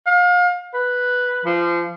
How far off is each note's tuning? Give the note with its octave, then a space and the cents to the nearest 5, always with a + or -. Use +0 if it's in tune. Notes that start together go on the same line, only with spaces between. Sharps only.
F5 +35
B4 +0
F3 -25